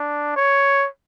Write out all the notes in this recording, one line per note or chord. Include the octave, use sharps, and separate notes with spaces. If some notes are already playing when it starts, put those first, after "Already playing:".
Already playing: D4
C#5